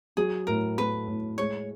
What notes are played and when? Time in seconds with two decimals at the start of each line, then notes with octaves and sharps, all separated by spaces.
0.17 F#3 G#4
0.47 A2 A#4
0.78 A3 B4
1.08 A2
1.38 G#3 C#5